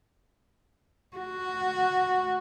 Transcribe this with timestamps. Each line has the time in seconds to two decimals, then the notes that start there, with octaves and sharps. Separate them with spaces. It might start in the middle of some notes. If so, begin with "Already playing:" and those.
1.17 F#4